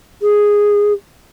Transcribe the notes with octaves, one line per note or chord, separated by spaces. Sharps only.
G#4